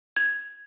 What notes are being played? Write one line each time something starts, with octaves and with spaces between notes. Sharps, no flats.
G#6